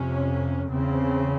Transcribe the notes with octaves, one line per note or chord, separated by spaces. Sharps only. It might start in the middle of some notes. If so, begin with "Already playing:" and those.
Already playing: F2 C3 C#4
E2 C#3 C4